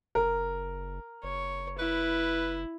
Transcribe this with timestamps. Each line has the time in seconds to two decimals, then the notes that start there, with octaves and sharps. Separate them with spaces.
0.15 F#1 A#4
1.24 F#1 C#5
1.79 E4 B4